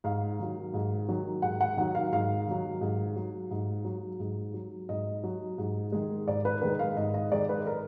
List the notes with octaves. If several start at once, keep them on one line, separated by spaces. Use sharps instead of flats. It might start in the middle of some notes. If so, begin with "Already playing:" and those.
G#2 F5
D#3 F#3
G#2
D#3 F#3
G#2 F#5
F#5
D#3 F#3 F#5
F5
G#2 F5
D#3 F#3
G#2
F#3
G#2
F#3
G#2
F#3
G#2 D#5
F#3
G#2
D#3 G#3
G#2 D5
B4
D#3 G#3 B4
F5
G#2 D#5
D#5
D#3 G#3 D5
B4
A#4